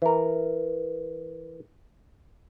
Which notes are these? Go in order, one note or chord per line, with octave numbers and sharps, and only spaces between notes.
E3 A#4